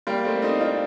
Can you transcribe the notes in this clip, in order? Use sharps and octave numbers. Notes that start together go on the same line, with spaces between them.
G3 A#3
A3 C4
C4 D#4
D4 F4